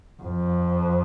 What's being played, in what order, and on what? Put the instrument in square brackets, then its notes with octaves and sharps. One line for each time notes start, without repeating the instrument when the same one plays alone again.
[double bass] F2